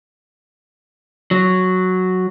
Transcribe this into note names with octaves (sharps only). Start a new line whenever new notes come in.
F#3